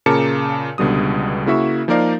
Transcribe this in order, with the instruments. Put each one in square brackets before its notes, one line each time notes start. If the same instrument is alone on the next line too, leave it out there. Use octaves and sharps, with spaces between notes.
[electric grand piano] A#2 C#3 A#4 A5 D6 C#7
C#2 B2 D3 G3 D#6
C#3 A#3 E4 F#4 E5 C#6
F3 A#3 D#4 A#4 D5 F5